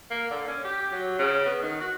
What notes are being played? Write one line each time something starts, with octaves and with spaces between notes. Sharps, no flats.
A#3
D3
C#4
G4
F#3
C#3
B3
D#3
F#4